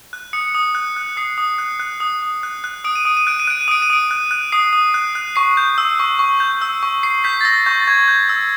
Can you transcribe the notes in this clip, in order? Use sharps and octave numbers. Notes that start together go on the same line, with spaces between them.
F#6
D#6 C#7
D#6
F#6
F#6
D#6 C7
D#6
F#6
F#6
D#6
D#6
F#6
F#6
D#6 D7
D#7
D#6 D7
D#7
F#6 D7
D#7
F#6 D7
D#7
D#6 D7
D#7
D#6 D7
F#6
F#6
D#6 C7
D#6
F#6
F#6
C#6 C7
G6
E6
C#6
C#6
G6
E6
C#6
C#6 C7
G6 B6
A6
E6 A#6
C#6 G6
A6
C#6 G#6
G6
E6